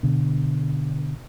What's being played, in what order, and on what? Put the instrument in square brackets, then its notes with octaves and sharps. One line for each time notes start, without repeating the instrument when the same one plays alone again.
[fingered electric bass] B2 D3